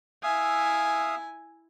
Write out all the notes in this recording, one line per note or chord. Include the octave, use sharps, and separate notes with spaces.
E4 E5 F5 G#5 D#6